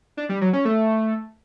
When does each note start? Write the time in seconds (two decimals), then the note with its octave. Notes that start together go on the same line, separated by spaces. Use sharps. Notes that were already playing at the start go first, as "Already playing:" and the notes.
0.17 D4
0.29 G3
0.41 F#3
0.53 C#4
0.65 A3